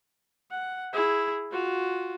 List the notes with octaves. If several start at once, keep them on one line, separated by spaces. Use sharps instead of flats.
F#5
E4 G#4
F4 F#4